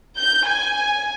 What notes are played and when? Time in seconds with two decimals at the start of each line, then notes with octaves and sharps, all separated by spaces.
0.17 G6
0.48 G#5